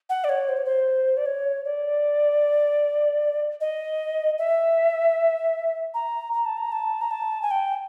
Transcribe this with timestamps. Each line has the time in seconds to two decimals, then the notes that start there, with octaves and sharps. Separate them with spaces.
0.09 F#5
0.24 D5
0.29 C#5
0.49 C5
0.57 C#5
0.65 C5
1.17 D5
1.26 C#5
1.65 D5
3.61 D#5
4.38 E5
5.94 A#5
6.33 A#5
6.46 A5
6.57 A#5
6.72 A5
7.01 A#5
7.11 A5
7.42 G#5
7.51 G5